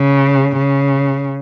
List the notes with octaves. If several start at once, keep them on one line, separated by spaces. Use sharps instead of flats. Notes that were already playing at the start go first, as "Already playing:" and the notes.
Already playing: C#3
C#3